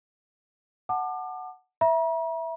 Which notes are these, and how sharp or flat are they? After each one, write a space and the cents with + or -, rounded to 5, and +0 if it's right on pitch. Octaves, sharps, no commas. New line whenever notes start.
F#5 +0 A5 +0 D6 +35
E5 +0 A#5 +45